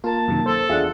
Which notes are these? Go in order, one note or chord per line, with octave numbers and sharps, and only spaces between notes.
A#3 F4 A#4 A5
F#2 C3 D#3
A4 C5
E2 D4 F4 G#4 E5 F#5